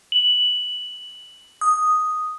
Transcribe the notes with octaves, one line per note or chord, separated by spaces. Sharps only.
F#7
D#6